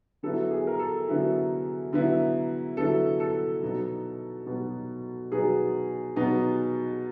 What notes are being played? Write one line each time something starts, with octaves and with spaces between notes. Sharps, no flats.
D3 F#3 B3 E4 A4
G#4
A#4
A4
D3 F#3 B3 E4
D3 F#3 B3 E4
D3 F#3 B3 E4 A4
A4
B2 F#3 B3 D#4
B2 F#3 B3 D#4
B2 F#3 B3 D#4 G#4
B2 F#3 B3 D#4